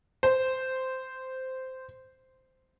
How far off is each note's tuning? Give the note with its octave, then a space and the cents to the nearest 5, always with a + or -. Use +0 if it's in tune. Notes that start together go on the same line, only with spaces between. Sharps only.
C5 -10